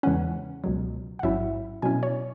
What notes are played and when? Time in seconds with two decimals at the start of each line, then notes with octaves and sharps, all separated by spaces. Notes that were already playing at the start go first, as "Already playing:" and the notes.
0.03 E2 C#3 E3 G#3 C#4 F#5
0.64 C#2 B2 F#3
1.19 F#5
1.23 A1 G#2 F#3 C#4 E4 E5
1.82 B2 F#3 C#4 E4 G#5
2.03 C#5